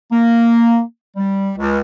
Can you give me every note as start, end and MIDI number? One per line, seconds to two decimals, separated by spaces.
0.12 0.80 58
1.16 1.52 55
1.57 1.80 37